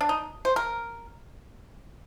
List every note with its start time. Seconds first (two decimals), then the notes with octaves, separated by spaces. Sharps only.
0.01 D4
0.09 D#4
0.45 C5
0.56 A#4